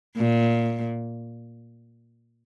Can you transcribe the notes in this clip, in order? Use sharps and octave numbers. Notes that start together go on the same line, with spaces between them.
A#2